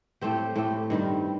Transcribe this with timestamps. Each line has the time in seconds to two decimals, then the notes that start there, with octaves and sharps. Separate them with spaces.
0.21 A2 A3 C4 G4
0.56 A2 A3 C4 G4
0.90 G2 D#3 G3 C4